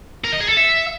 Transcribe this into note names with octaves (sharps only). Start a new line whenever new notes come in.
A#4
D#5
G#4
A4
E5